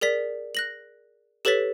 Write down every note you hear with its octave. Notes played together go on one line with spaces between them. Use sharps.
G#4 A#4 D5 B6
F#6 A#6 F#7
G4 A4 B4 C#5 A6 B6